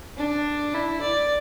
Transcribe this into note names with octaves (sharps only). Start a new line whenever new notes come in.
D4
E4
D5